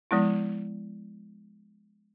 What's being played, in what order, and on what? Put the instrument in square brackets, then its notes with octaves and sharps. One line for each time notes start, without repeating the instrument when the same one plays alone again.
[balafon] F3 G#3 B3 E4